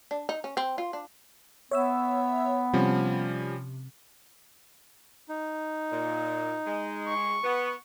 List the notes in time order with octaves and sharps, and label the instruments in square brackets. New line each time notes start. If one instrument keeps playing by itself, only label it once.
[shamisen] D4
D#4
C#4
C4
F4
D4
[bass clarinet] B3 [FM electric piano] C#5 E5 E6
[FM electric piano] C3 [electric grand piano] F3 G3 C#4
[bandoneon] D#4
[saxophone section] A#2
G#3
[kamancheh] C#6
[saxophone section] B3